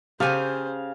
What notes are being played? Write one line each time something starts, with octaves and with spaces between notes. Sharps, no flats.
C#3 G4 A4 C5 F5 G#5